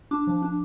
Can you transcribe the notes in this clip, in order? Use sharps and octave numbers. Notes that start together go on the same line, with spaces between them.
D4 D6
F3
D4